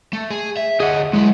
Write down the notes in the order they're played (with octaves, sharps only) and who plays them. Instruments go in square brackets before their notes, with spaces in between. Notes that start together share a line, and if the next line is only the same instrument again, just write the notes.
[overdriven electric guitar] A3
G#4
E5
[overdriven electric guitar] D2 D#5 [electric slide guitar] G#4 F#5
[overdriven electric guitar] F#3 E4 [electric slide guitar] G#3